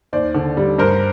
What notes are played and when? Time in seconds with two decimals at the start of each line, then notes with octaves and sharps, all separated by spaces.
0.13 D#2 C5 D5
0.35 D3
0.57 G3
0.79 G2 A#4 C5